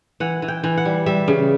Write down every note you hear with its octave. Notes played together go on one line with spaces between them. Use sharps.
E3 F#5
E3
G5
E3
F#5
G3
G3 E5
C#3